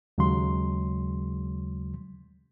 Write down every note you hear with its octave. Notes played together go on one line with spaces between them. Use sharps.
D#2 C#3 F#3 G#3 C6